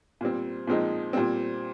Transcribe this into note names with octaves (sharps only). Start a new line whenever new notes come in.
A#2 G3 C4
A#2 F3 G#3 C4 D#4
A#2 G3 C4